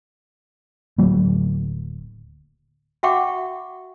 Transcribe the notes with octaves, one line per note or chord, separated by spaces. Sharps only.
D1 D2 F#3 A#3
F#4 E5 F#5 G5 C#6 D6